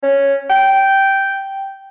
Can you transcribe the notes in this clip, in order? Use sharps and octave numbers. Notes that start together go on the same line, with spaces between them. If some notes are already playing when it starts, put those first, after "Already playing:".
C#4
G5